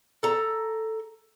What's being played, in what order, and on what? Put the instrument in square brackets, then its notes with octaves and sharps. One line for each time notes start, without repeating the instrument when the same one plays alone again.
[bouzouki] A4 A#5